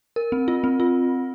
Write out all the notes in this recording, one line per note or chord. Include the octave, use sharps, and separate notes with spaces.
A#4
C4
F4
C4
F4